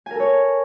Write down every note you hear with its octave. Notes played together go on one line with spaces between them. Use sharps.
A4 A#4 C#5 G#5